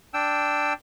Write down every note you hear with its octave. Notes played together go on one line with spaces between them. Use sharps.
D4 G5 E6